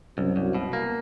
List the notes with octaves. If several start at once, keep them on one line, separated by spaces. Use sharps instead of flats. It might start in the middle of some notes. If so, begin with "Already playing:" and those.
C2 F#2 F#3
C2
B2
A#3